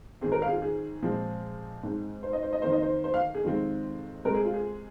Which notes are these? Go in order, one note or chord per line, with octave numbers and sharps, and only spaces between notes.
G#2 D#3 C4 G#4
A#4
F5
G#4
F4
G#4
A#2 F3 G#3 C4
G#2 G#3 C4
C5
D#5
C5
D#5
F2 D#3 A#3 C5
D#5
C5
C5
F5
G#4
F2 C3 D#3 G#3 C4 F4
C3 G#3 C4 A#4
G#4
F4
G#4